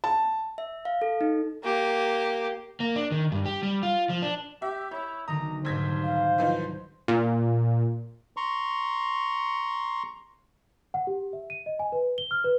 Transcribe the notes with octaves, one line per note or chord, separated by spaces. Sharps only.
A5
E5
F5
A4
D#4
A#3 G4
A#3
D4
D#3
G2
G4
G3
F4
F3
D4
G4 E5
E4 C#5 G6
B1 D3 D#3 A#5 D#6
F1 C2 G#2 F#3 C5 G#6 B6
F5
E3 F3 D#4
A#2
A#5 C6 C#6
F#5
G4
E5
D#7
D#5
G#5
B4
G7
F6
B4